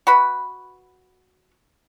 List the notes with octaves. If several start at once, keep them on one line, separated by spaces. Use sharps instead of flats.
F#4 B4 B5